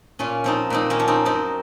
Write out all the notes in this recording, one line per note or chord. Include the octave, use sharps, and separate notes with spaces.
A#2 C#4 F4
F3 C4 D#4
A#2 C4 D#4
A#3 C#4
F3
C4 D#4
F#2 C4 D#4